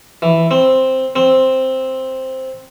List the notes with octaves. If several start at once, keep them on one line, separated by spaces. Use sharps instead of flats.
E3
C4
C4